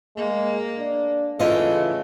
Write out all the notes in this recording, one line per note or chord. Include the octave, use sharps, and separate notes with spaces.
G#3 A#3
D4
C#3 E3 A3 E4 F4 D#5